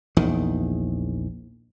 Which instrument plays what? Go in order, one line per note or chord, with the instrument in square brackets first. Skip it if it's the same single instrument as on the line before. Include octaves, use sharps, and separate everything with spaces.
[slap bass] A#1 E2 D#3